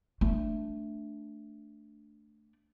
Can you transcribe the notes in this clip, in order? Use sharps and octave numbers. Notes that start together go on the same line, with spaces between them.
A3 D4